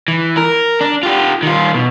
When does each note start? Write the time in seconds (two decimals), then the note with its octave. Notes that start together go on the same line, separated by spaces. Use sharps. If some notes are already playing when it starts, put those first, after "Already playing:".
0.08 E3
0.37 A#4
0.81 D4
1.03 F4 G4
1.43 D#3 F4
1.75 B2